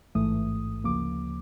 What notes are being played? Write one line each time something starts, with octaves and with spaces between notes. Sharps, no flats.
A1 G#2 E3 A3 D#6
D2 C#3 F3 A#3 D6